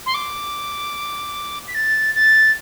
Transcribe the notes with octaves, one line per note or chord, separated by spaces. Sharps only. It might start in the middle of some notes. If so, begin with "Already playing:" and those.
C6
D6
B6
A6
A6